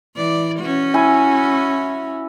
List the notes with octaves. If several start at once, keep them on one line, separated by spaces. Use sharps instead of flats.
E3 D5
C#4 F#4
E4 G#5